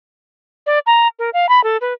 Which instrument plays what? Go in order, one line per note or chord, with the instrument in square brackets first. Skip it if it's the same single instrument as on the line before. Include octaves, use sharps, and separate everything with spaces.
[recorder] D5
A#5
A#4
F5
B5
A4
B4